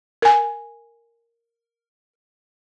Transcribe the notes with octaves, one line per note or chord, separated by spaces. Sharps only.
A#4 G#5